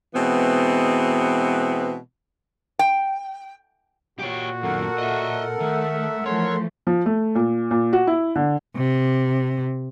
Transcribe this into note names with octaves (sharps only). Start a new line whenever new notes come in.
B2 E3 G#3 B3 C4
G5
A#2 F#4 G4 C#5
F#2 D#3 A4 A#4 F#5
D#5 E5
D#3 A3 E5
E3 F3 A3 C#5 C6
F3
A3
A#2
A#2
F#4
E4
D3
C3